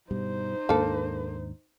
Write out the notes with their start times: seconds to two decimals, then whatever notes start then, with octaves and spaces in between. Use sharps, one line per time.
0.11 G2 B2 G3 D#4 C5
0.69 D#2 G#2 A#3 D4 A4